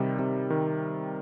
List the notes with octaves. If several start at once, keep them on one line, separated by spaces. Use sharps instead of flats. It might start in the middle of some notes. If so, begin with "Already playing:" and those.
Already playing: C3 D#3 G3
C3
D#3